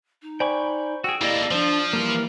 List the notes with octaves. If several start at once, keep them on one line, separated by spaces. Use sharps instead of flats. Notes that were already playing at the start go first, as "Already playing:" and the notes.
D#4
C5 D5 G5 G#5 B5 C#6
F#4 G#4 G5 E6
A#3 E4 G4 A4 D5 D#5
F3 D4 C5
E3 G3 A#3 A#4